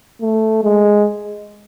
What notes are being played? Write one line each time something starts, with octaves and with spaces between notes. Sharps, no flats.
A3
G#3